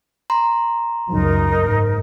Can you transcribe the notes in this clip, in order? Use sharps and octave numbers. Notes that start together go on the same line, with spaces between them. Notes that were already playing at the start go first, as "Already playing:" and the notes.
A#5 C6
C#2 F#2 C#3 D#4 A#4
F#1 G#2